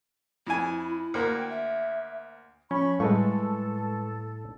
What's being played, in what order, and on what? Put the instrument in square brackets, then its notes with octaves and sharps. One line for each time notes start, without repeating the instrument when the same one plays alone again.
[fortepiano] F2 G#5 [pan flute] E4
[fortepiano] D2 A#3
[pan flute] G5
E5
[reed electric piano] F3 [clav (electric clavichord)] C#4 [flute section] B5 C#6
[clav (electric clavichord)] A2 [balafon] G3 [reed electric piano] G#3 B4 C#6 [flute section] A4